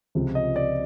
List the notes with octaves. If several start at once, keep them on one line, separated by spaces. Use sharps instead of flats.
C#2 C3 F3
D#5
D5